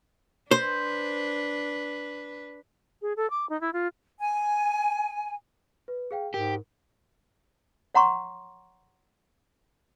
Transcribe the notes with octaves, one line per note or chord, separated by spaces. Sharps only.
D4 B4 C5
G#4
A4
D6
D#4
E4
F4
G#5
B4
G#4 F5 G5
G#2 G4 A#4
C#5 F#5 A#5 C6 C#6